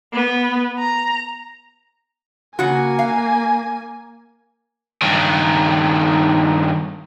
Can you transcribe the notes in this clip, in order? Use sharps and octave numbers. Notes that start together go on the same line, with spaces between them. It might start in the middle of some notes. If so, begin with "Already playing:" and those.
B3
A#5
C#3 A#3 F#4 G#5
F5
G2 D#3